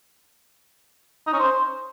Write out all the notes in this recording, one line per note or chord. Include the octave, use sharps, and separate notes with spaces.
D#4
C#4
C5